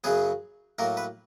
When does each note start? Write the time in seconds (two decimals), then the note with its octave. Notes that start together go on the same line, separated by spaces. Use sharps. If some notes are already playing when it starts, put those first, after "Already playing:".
0.04 F#2 C#3 F#3 B3 G#4
0.79 A2 F#3 A#3 A#4
0.97 B4